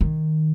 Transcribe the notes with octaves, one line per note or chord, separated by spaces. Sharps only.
D#3